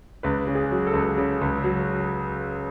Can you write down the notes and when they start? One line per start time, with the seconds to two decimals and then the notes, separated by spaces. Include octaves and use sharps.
0.23 C#2 B4
0.47 C#3
0.55 G#4
0.71 F#3
0.87 A4
0.93 C#2
1.17 C#3
1.41 C#2
1.64 F#3